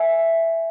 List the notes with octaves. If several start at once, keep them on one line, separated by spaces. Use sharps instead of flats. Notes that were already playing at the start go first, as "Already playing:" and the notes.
Already playing: E5 G#5